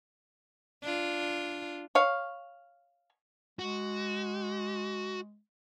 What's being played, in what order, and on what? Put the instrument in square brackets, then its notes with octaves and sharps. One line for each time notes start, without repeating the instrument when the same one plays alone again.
[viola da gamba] D4 F4
[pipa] C#5 F5
[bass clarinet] G#3 [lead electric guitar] F#4